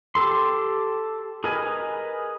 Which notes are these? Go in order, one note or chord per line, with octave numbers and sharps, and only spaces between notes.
G4 A4 C6
G#4 A#4 B4 D#5 G#5